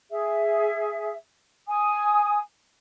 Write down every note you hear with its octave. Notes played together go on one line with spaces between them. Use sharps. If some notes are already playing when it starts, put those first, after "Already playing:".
G#4 E5
G#5 D#6